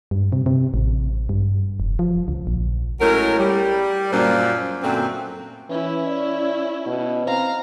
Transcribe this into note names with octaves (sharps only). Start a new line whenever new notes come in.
G2
C3
C3
A1
G2
F1
F3
C#2
A#1
A2 F#3 G#3 C#4 A#4
G3
F#2 A#2 A#3 D4 F4 C5
F#2 A#2 D3 A3 C4
E3 C#4 E4
D5
B2
C4 F5 A#5